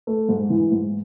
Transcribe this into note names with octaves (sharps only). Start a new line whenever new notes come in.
A3
G#2
E3
G#2